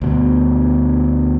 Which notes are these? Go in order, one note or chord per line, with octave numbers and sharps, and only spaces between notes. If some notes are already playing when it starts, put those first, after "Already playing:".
D2 B2